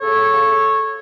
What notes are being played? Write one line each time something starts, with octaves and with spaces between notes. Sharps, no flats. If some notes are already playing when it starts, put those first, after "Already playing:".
C#3 A4 C#5
F#3
C#3